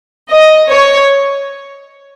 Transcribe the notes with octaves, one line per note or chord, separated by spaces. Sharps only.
D#5
C#5